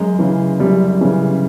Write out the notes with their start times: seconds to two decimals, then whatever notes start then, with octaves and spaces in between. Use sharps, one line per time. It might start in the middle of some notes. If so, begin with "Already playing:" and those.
Already playing: F#2 G#3
0.19 C#3 E3
0.60 F#2 G3
1.01 C#3 E3